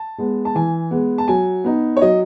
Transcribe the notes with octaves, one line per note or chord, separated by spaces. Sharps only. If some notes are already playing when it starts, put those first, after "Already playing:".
Already playing: A5
G#3 B3
A5
E3 G#5
G#3 B3
A5
F#3 G#5
B3 D#4
C#5
F#3 D#5